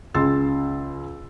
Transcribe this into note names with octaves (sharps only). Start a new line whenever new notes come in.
C#2 G#4 C6 E6 A6